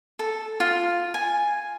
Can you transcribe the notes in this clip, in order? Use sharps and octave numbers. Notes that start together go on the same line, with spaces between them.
A4
F4
G#5